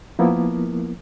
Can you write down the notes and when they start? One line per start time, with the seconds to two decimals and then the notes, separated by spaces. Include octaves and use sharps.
0.19 F3 A#3 B3 E4 A#4